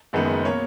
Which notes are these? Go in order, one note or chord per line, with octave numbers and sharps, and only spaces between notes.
F#1 F#2 D#3 G#3 B3
B2 A#3 C#5